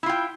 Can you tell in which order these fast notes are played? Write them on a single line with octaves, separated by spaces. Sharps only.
E4 F4 G5